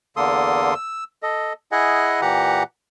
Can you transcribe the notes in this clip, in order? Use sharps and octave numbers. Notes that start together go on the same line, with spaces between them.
E2 D3 A#3 A4 C6 D#6
E6
A4 D#5
E4 G#4 D#5 F#5 G#5
A#2 E3 G4 F#5 A#5